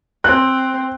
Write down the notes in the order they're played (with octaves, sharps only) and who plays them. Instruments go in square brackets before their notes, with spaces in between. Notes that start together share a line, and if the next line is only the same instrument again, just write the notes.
[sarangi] C4 [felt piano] F#6